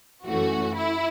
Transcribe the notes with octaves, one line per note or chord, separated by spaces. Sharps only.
F#2 E3 A3 C#4 F#4
E4